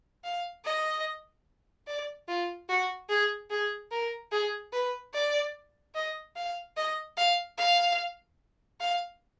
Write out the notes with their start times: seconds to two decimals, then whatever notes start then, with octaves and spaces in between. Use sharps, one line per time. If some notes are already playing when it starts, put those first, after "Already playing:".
0.24 F5
0.65 D#5
1.87 D5
2.28 F4
2.69 F#4
3.10 G#4
3.50 G#4
3.91 A#4
4.32 G#4
4.73 B4
5.14 D5
5.95 D#5
6.36 F5
6.77 D#5
7.17 F5
7.58 F5
8.80 F5